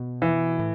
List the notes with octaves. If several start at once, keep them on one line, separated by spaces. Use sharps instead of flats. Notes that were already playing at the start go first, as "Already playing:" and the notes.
Already playing: B2
E3
A2